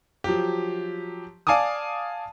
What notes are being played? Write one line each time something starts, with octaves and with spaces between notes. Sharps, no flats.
F3 F#3 G4
D5 F5 G#5 A5 D6 D#6